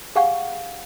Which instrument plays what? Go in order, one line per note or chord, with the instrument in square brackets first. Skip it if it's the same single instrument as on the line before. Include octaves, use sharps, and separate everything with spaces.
[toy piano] G4 G#4 F5 F#5 G#5 C#6